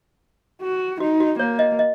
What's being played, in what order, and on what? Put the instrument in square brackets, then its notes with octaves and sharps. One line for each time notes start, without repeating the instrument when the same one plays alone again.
[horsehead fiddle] F#4
[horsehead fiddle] D#4 [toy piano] F#4
[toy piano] F#4
[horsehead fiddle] A#3 [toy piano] C#5
[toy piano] D#5
D#5